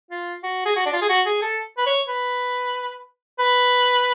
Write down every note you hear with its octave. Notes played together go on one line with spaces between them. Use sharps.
F4
F#4
G#4
F#4
D4
F4
G#4
F#4
G#4
A4
B4
C#5
B4
B4